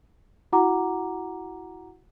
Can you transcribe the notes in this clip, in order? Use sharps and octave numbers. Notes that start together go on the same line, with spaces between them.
E4 F#4 F#5 A#5 D6